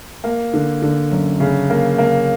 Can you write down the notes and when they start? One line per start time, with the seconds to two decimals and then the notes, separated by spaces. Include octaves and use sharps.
0.24 A#3
0.54 D3
0.82 D3
1.12 F#2
1.40 C#3
1.70 A#3
1.98 A#3